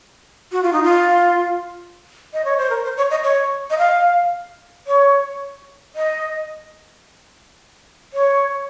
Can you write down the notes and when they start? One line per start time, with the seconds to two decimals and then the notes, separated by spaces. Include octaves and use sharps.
0.52 F#4
0.63 F4
0.73 D#4
0.83 F4
2.33 D#5
2.45 C#5
2.58 C5
2.70 A#4
2.84 C5
2.97 C#5
3.11 D#5
3.24 C#5
3.70 D#5
3.78 F5
4.87 C#5
5.96 D#5
8.13 C#5